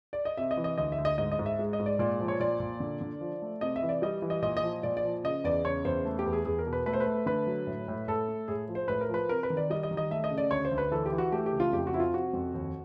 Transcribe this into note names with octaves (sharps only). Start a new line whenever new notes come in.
D5
D#5
C3 E5
D#5
E3
D#5
D2 D#5
E5
D2
D#5
G#2 D#5
D#5
G#2
E5
G#3
D#5
G#2
D5
A#2 D5
F3
C#5
A#2 D5
A#2
D3
D3
F3
A3
C3 D#5
E5
E3
D5
G3 D#5
E3
D#5
A#2 D#5
D#5
F3
A#2 D5
D5
F3
C#3 D#5
E2 D5
C#3 C#5
E2 C5
A3
G4
E2
G#4
E2 G#4
A#4
B2
B4
A3 B4
C5
B4
A3
D3 B4
F#3
A2
A2
A2 A4
A3
A2 G#4
F3
C5
A2 B4
A#4
F3 B4
C3 A#4
B4
D#3
D5
G3 D#5
D#5
D#3
D#5
A3 E5
D#5
C#3
D5
D2 C#5
C5
D2
B4
E3 A4
G4
E3
F#4
A3 G4
G4
C#2
F4
F2 G4
F#4
F3 E4
F4
C3 F#4
F2
D#2